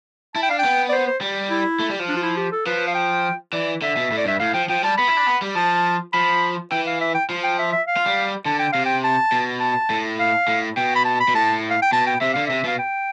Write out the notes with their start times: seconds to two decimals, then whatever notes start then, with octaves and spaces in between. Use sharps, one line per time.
0.35 E4 A5
0.42 G5
0.49 D4 F5
0.59 G5
0.64 B3
0.89 D5
0.92 C5
1.07 C5
1.21 G3
1.50 E4
1.80 A3
1.90 G3
2.00 F3
2.09 D4
2.16 F4
2.23 E4
2.37 G4
2.52 A4
2.66 F3 B4
2.87 F5
2.95 G5
3.53 E3 D5
3.82 D3 E5
3.97 B2
4.12 A2
4.17 D5
4.25 G2 E5
4.39 A2 F5
4.54 F3 G5
4.69 F3 G5
4.83 G3 A5
4.97 B3 B5
5.08 E4
5.17 D4
5.27 B3
5.42 G3
5.55 F3 A5
6.13 F3 B5
6.71 E3 G5
6.87 F5
7.01 E5
7.15 G5
7.30 F3
7.44 G5
7.59 E5
7.72 E5
7.87 F5
7.97 F4
8.06 G3
8.46 D3 A5
8.59 G5
8.72 C3 F5
8.85 G5
9.04 A5
9.32 B2
9.60 A5
9.90 A2
10.19 F5
10.48 A2
10.76 B2 G5
10.95 B5
11.05 A5
11.20 B5
11.28 B2
11.34 A2 A5
11.70 F5
11.82 G5
11.92 B2 A5
12.07 G5
12.21 C3 E5
12.34 D3 F5
12.47 C3 E5
12.64 B2 F5
12.79 G5